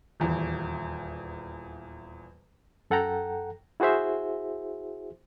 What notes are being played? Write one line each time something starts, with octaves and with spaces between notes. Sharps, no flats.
D#1 E2
F#2 A4 F#5 G5 A#5
E4 F#4 G#4 C5 E5